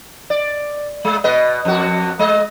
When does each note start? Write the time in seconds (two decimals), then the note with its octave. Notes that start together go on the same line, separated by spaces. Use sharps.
0.30 D5
1.05 G#3
1.24 B2 B4 D#5
1.65 F2 F#4
2.19 G#3 D#5